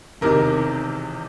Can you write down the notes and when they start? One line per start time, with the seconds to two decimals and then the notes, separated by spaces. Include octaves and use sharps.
0.21 E1 E2 C3 D#3 A#4